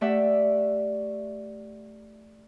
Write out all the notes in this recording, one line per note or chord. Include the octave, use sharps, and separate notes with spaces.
A3 G4 D5 E5 F#5